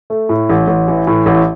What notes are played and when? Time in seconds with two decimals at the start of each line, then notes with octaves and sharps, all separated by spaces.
0.10 A3
0.29 A2
0.50 A1
0.68 A1
0.88 E3
1.07 A2
1.26 A1